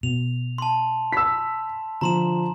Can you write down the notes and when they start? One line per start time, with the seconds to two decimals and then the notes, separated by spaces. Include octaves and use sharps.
0.03 B2 F7
0.58 A5 C6
1.12 B5 E6 B6
2.01 D3 F3 A#5 C6 E7